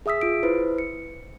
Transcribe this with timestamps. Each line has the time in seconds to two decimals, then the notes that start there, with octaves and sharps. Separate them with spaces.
0.06 G#4 E5 D#6 E6 B6
0.21 F4 D7
0.43 E4 B4 C5
0.78 C#7